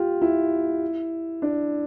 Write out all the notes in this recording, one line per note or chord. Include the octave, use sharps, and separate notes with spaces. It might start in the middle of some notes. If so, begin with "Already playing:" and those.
Already playing: F4 G4
E4
D4